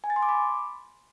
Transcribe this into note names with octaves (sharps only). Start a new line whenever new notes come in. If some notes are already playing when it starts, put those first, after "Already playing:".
G#5
A6
C6
D6
B5